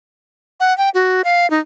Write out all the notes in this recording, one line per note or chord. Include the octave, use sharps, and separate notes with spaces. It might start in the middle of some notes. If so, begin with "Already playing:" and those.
F#5
G5
F#4
F5
D#4